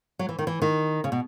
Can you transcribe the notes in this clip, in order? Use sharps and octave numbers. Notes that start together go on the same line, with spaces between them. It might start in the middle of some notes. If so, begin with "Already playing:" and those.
F#3
E3
D#3
E3
D#3
C#3
B2